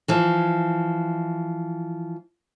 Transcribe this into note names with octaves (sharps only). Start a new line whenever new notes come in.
E3 F3 E4